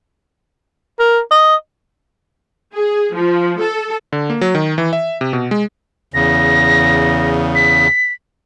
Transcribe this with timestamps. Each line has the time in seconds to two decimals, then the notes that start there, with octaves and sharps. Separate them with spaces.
0.99 A#4
1.31 D#5
2.75 G#4
3.15 F3
3.61 A4
4.13 D3
4.30 A#3
4.41 F#3
4.55 D#3
4.78 E3
4.93 E5
5.21 C3
5.33 B2
5.51 G#3
6.14 E2 C#3 A#6
7.55 B6